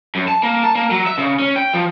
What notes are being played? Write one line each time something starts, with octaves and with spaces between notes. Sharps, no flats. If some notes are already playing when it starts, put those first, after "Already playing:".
F#2
A5
A#3
A5
A#3
F#3
E5
C#3
C#4
G5
F3